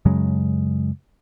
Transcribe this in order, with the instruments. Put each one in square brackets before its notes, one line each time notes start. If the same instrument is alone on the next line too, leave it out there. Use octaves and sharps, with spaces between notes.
[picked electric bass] F#2 C#3 F#3 G#3